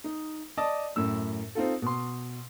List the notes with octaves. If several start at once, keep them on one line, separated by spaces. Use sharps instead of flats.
D#4
D5 D#5 A5 D#6
F#2 A2 E6
C4 D#4 F4 A4
B2 C6